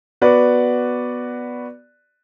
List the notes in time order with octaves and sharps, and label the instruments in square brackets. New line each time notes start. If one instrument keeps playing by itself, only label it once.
[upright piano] B3 F#4 B4 D5